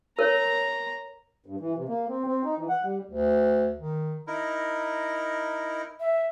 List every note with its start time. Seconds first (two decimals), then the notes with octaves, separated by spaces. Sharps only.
0.19 A#4 C#5 A#5
1.46 G2
1.60 E3
1.76 C3
1.88 A#3
2.09 C4
2.27 C4
2.45 D#4
2.58 E3
2.69 F#5
2.83 G3
3.09 D2
3.78 D#3
4.27 D#4 E4 A#4
6.00 E5